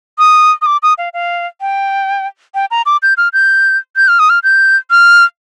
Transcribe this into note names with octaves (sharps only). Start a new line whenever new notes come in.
D#6
D#6
D6
D#6
F5
F5
G5
G5
A#5
D6
G6
F6
G6
G6
F6
D#6
F6
G6
F6